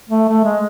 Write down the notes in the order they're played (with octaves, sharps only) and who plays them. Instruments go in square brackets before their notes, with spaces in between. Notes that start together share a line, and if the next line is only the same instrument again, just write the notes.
[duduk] A3
A3
G#3